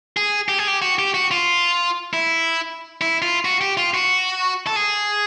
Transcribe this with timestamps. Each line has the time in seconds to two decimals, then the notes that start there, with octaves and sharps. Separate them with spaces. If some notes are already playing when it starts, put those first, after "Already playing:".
0.17 G#4
0.49 G4
0.59 G#4
0.67 G4
0.82 F#4
0.99 G4
1.14 F#4
1.31 F4
2.13 E4
3.01 E4
3.22 F4
3.45 F#4
3.61 G4
3.77 F4
3.94 F#4
4.67 A4
4.76 G#4